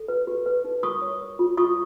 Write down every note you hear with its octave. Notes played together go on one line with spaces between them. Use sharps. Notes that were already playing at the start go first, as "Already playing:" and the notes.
Already playing: A4
B4
G4
B4
D#4
A#4 C#6 D#6
C#5
A#4
F4
F4 C#6 D#6